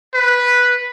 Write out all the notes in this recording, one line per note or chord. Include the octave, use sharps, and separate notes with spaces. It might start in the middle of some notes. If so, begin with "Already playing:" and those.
B4